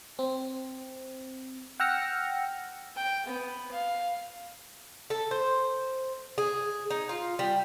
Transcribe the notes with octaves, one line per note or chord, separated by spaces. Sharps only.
C4
F#5 G5 E6 F6 A#6 C#7
G5
B3
F5
A4
C5
G#4
D#4
F4
G3